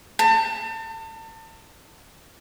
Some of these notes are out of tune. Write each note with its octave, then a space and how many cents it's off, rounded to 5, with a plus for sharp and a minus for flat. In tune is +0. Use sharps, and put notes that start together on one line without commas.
A5 +35